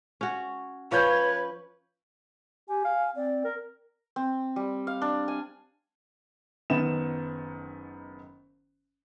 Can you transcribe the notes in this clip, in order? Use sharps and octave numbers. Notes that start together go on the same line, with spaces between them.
C#4 F#4
F3 C#4 B4 C#5 C#6 G6
G4 G#5
F5
C4 D5
A#4
C4
G3
F5
D4
G#5
F#1 F#2 D#3 B3 E7